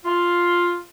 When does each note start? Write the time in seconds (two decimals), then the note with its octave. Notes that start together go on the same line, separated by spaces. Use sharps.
0.05 F4